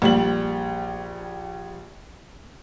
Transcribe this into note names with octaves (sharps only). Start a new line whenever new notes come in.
A#1 G3 F#7